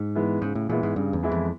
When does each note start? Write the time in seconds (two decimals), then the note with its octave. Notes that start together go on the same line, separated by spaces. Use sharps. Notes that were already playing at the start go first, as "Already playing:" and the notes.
Already playing: G#2
0.15 E3 G#3 B3 E4
0.42 G#2 C#3
0.55 A2
0.69 A#2 E3 G#3 B3 E4
0.83 G#2
0.96 G2 C#3
1.13 E2
1.23 E3 G#3 B3 E4
1.32 F2